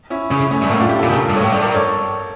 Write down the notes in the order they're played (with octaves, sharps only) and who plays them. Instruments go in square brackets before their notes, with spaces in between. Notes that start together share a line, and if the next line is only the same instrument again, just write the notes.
[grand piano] C#4 E4
[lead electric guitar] C#3 [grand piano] C#4 E4
[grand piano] A3 C#4
[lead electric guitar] G2
[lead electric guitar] A2 [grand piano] A#3
[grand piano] D4 F4
E4 G4
F4 A4
[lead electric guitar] A#2
[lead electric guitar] C#3 [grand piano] G4 A#4
[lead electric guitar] G2
[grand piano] A4 C#5
[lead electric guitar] A2
G2
[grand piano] A#4 D5
A4 C#5